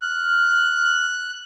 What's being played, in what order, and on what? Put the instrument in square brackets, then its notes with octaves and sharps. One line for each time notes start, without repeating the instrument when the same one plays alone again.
[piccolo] F6 [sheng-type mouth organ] F#6